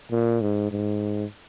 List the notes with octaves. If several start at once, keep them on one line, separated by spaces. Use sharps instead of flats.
A#2
G#2
G#2